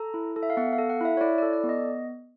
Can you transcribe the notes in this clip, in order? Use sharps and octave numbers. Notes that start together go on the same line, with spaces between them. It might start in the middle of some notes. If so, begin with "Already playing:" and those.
Already playing: A4 A#5
E4
A4
E5
F5
B3 F#5
F5
A4
F#5
E4 E5
C#5
E4 D5
A4 D5
D5
B3
D#5